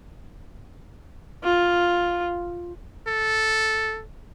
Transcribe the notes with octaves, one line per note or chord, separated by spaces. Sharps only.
F4
A4